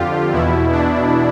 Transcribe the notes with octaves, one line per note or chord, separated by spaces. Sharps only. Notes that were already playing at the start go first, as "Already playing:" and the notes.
Already playing: F2 D3 F4 G4
E2 B2 E4
D4